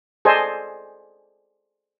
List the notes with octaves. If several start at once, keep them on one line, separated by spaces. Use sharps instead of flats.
G#4 A4 C5 D5 D#5 G#5